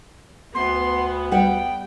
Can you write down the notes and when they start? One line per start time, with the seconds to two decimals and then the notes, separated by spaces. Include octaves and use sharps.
0.54 D2 B3 C6
1.31 G3 F#5 G5